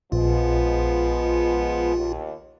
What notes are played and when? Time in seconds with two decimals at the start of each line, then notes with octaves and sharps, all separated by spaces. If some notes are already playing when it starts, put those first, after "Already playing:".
0.12 A#1 F3 G#3 B3 F4
1.96 D#2